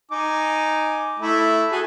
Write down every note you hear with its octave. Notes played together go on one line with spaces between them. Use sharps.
D#4 G#5 D6
A3 E4
F#4 G#4 A4